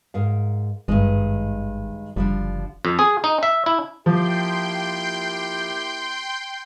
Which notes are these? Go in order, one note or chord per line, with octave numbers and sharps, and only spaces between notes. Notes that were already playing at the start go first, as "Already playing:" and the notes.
G#2 A#4 F5
G#1 G2 D#3 G#3
F#1 D3 F3 G3
F2
G#4
D#4
E5
E4
F3 A#3 E4 G4 G5 C6 G6